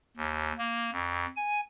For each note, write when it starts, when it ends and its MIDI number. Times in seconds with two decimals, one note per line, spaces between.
0.17 0.52 39
0.58 0.90 58
0.92 1.26 41
1.36 1.61 80